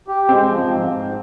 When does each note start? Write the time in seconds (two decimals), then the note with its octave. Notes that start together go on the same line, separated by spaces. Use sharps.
0.08 G4
0.28 G#3 C4
0.49 F3
0.70 G#2
0.90 G#2